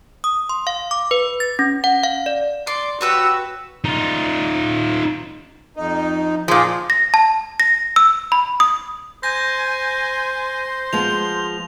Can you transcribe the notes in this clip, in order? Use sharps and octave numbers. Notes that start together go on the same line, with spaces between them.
D#6
C6
F5
D6
B4
A6
C#4
F#5
F5
D5
D5 C6
F#4 G4 B4 C#5 E6
D#4 F4
F2 D#4
A#2 F3 G#4
A#6
A5
A#6
E6
B5
D#6
C5 G#5 G6 A#6
F3 G#3 B3 C6 F7